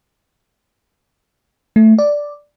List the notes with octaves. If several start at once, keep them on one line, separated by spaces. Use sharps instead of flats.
A3
D5